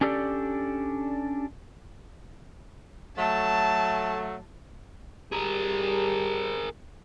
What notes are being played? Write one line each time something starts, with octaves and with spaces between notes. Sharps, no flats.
C#4 D4 G4 A4 D5
F#3 A3 A5
G3 G4 G#4 A#4